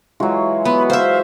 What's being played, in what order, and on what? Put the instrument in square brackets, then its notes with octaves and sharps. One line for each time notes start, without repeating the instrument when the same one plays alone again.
[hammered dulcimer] E3 G#3 F4 [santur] F#3 F#4
[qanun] B3 [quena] B5
[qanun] C5 E5 [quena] F5